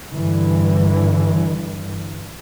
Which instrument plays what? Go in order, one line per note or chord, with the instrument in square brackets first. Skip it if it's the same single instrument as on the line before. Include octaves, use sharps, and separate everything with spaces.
[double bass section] G2 D3 E3